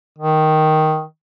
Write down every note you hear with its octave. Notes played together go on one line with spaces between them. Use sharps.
D#3